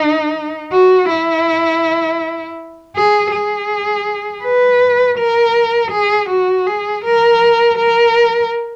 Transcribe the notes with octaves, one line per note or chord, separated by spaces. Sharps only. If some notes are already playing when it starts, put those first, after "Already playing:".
Already playing: D#4
F#4
E4
G#4
G#4
B4
A#4
G#4
F#4
G#4
A#4
A#4